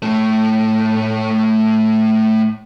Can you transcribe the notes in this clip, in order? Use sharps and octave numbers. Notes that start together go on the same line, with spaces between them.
A2 A3